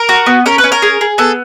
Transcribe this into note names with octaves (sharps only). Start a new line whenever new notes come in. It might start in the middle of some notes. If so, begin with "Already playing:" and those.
Already playing: A#4
F#4
B3
C#4 A#4
B4
C#4
A#4
G#4
G#4
B3 A4